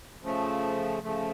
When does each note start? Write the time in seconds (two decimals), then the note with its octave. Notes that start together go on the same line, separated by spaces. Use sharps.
0.22 C#3 F3 A3
1.03 C#3 F3 A3